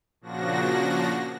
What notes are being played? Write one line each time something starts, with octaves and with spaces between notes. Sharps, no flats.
A#2 C#3 F3 D4 F#4 A#6